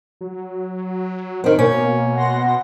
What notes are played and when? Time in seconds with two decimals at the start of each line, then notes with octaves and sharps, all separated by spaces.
0.21 F#3
1.44 D#3 C4
1.59 B2 A#3 C#4
2.15 F#5 C6 A#6